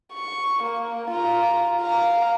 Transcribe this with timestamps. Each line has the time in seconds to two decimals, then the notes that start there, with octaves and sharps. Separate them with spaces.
0.13 C#6
0.63 A#3
1.11 F4 A#5
1.82 F5 A#5